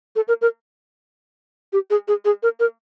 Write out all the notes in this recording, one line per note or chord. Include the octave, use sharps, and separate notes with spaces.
A4
A#4
A#4
G4
G#4
G#4
G#4
A#4
A#4